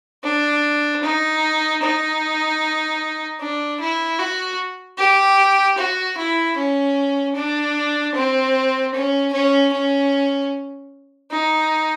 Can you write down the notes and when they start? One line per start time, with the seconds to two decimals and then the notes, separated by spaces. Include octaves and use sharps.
0.24 D4
1.03 D#4
1.82 D#4
3.40 D4
3.80 E4
4.19 F#4
4.98 G4
5.77 F#4
6.18 E4
6.57 C#4
7.36 D4
8.15 C4
8.94 C#4
9.33 C#4
9.73 C#4
11.31 D#4